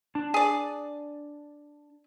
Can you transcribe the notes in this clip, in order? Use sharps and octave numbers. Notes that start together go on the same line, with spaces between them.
D4 A5
G#4 D5